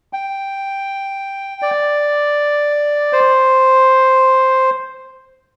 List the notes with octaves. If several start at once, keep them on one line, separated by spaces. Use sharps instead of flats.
G5
D5
C5